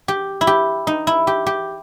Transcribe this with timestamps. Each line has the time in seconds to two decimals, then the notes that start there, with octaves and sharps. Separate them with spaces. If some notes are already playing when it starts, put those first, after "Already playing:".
0.08 G4
0.41 E4
0.47 G4
0.87 D#4
1.07 E4
1.27 G4
1.46 G4